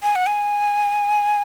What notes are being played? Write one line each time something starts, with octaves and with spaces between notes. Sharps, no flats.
G#5
F#5
G#5